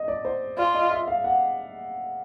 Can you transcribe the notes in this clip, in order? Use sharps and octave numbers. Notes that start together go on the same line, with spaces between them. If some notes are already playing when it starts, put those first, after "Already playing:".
Already playing: D#5
D5
C5
F4 D5
D#5
E5
F5
F#5